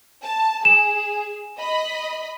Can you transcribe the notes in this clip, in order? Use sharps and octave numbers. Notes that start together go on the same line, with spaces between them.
A5
G#4 E7
D#5 B5